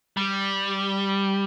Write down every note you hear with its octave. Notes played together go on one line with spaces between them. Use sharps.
G3